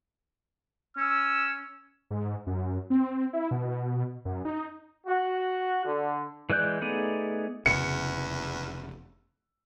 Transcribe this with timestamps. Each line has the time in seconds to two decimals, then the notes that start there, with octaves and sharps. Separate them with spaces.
0.97 C#4 E6
2.11 G#2
2.47 F#2
2.90 C4
3.33 E4
3.51 B2
4.25 F#2
4.45 D#4
5.06 F#4
5.85 D3
6.50 E3 G#3 D5 F#6 G6
6.81 A3 B3 D#4 G#4 D5
7.66 F1 E2 C#3 C#7